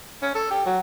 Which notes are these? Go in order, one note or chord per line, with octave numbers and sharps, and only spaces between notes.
C#4
A4
G4
F#3